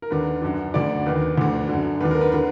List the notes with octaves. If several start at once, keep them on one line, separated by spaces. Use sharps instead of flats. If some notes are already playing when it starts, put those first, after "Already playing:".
A#4
D#2 D3 B4
F#2 D3
D2 D3 D5
D#2 D#3 B4
D2 D3
F#2 D3
D#2 D3 B4
A#4
B4
D3 B4